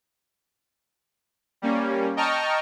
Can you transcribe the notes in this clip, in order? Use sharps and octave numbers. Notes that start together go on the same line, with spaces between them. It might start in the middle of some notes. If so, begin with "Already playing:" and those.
G3 A#3 C#4
D#5 G5 A5 A#5 C#6 F6